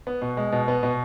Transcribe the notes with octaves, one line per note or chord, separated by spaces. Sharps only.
B3
B2
G#3
B2
B3
B2